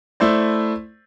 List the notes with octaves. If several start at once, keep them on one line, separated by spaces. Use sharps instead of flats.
A3 E4 C5 D5